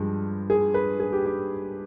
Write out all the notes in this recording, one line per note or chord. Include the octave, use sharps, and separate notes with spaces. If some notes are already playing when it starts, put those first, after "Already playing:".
Already playing: G2 F3 G#3
G#4
B4
G#4
G4
G4